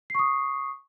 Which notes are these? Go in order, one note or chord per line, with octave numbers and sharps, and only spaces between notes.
C#6 D#6 C7